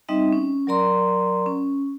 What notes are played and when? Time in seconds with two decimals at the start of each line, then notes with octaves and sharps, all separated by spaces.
0.08 G3 C4 D#4 D#5 E5
0.33 C#4
0.67 F#3 A#4 D5 A#5 C6
1.46 C#4